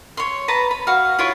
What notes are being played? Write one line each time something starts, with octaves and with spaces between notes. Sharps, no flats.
C#5 C6
B4 A5 A#5
B5
F#4 F5
E4 F4 C#5